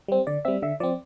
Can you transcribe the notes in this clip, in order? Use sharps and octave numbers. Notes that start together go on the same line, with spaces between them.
G3 C4
D3 D5
G3 C4 E5
D3 E5
F3 C4 D5